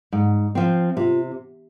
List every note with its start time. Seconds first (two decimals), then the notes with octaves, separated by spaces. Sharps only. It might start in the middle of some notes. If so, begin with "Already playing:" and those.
0.12 G#2
0.55 F3 C4
0.97 C3 F4